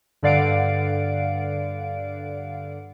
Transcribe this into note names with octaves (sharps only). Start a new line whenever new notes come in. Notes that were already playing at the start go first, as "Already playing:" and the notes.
G2 D3 D5 F5 F#5 D7